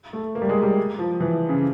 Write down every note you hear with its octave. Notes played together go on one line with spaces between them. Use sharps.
A3
A#3
G3
G#3
G3
F3
E3
C#3